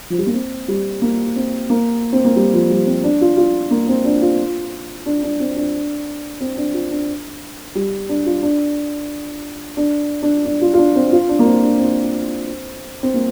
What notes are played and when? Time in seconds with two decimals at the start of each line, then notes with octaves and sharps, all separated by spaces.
0.10 F3
0.18 G3
0.27 A#3
0.34 C4
0.68 G3
1.02 A#3
1.36 C4
1.70 A#3
2.13 C4
2.25 A#3
2.36 G3
2.53 F3
2.70 G3
2.87 C4
3.04 D4
3.21 F4
3.37 F4
3.71 A#3
3.89 C4
4.05 D4
4.22 F4
5.06 D4
5.23 D4
5.40 C4
5.56 D4
6.41 C4
6.57 D4
6.74 F4
6.91 D4
7.75 G3
8.09 D4
8.26 F4
8.43 D4
9.77 D4
10.22 D4
10.45 D4
10.61 F4
10.74 F4
10.78 D4
10.96 C4
11.12 F4
11.29 D4
11.39 A#3
11.46 C4
11.63 D4
11.79 C4
13.03 C4
13.14 A#3